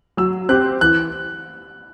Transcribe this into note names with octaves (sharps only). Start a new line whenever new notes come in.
F#3 E6
C4 G4 F#6
E3 F#6